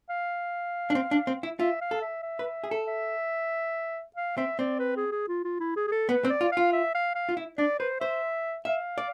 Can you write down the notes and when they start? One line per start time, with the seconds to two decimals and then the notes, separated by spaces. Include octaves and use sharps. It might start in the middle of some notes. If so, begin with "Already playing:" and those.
0.10 F5
0.90 D4
0.95 C4
1.11 D4
1.27 C4
1.43 E4
1.59 F4 E5
1.81 F5
1.91 A4
2.02 E5
2.23 E5
2.39 B4
2.64 G#4
2.71 A4
2.87 E5
4.16 F5
4.37 C4 E5
4.59 C4 D5
4.80 B4
4.97 G#4
5.12 G#4
5.28 F4
5.44 F4
5.60 E4
5.77 G#4
5.88 G#4
5.92 A4
6.09 B3 B4
6.25 C4
6.30 D5
6.41 F4
6.52 F5
6.57 F4
6.73 E5
6.95 F5
7.15 F5
7.29 F4
7.37 E4
7.58 D4 D5
7.79 B4 C5
8.01 C5 E5
8.65 E5 F5
8.98 D5